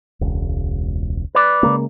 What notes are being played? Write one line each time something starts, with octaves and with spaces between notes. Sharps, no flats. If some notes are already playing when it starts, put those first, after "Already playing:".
E1 C#2
B4 D5
C#3 G#3 A#3